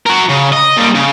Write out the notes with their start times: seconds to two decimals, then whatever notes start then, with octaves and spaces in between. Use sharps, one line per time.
0.06 F#4 A#4
0.29 C#3
0.52 D#5
0.77 A#2 G3
0.95 C#3